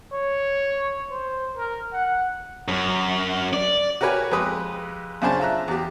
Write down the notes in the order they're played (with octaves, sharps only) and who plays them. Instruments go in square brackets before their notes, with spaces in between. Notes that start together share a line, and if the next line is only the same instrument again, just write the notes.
[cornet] C#5
C5
A#4
F#5
[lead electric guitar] F#2
D5
[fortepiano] F#4 G4 A#4 B4 C#5 G#5
F2 G#3 G4 B4 D#6
F#2 C#3 D4 G#4 C5 A5
F4 E5 A#5 F#6
E2 G4